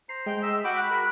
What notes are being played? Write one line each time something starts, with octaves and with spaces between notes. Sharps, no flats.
C5 A#5 C7
G#3 G5
D#5 E5 E6
F#4 F#5 G5 B5 D6
F#6
F#4 A#4